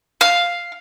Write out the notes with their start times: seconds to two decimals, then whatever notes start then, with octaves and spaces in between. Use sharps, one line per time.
0.21 F5